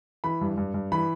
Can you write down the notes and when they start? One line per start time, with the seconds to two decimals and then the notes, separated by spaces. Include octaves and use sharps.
0.24 E3 B5
0.41 G2
0.57 G2
0.74 G2
0.92 E3 B5